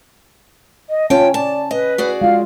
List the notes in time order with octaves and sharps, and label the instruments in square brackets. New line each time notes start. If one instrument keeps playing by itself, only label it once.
[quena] D#5
[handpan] C#4 [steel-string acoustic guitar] F4 C#5 G5 [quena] A5
[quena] D5 [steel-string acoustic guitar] A5
[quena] B4 [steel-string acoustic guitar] D#5
[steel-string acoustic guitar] F#4 G#4 D5
[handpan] G#3 F4 [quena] F5